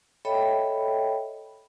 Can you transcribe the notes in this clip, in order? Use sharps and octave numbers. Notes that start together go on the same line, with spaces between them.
A4 C#5 D#5 E5 G5 B5